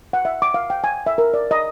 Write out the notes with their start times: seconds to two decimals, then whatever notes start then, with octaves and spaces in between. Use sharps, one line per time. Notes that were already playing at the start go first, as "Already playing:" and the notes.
0.13 F#5
0.25 E5
0.42 D6
0.54 F5
0.70 G5
0.84 G#5
1.06 E5
1.18 A#4
1.34 D5
1.51 D#5